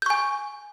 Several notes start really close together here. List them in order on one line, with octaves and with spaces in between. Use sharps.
G6 C#6 G#5